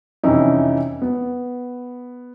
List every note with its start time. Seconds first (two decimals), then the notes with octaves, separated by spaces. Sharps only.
0.23 F2 C3 E3 C#4 D#4 E4
1.02 B3